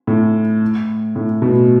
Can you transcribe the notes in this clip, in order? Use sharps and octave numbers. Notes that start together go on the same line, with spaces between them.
A2
A2
B2